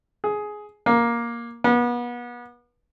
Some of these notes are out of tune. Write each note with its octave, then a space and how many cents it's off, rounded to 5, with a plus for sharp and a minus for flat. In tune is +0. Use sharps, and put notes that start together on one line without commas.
G#4 +10
A#3 +10
B3 -35